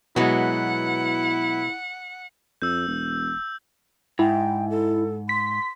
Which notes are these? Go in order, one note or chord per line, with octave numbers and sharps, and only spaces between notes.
B2 F#3 G#3 B3 E4 F#5
F2 E6 G6
E1
G#2 E4 G5
A4
C6 B6